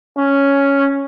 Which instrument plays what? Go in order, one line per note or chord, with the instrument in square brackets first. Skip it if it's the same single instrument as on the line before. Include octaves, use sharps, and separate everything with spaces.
[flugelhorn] C#4